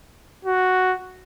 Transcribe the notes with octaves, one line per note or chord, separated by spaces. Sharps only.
F#4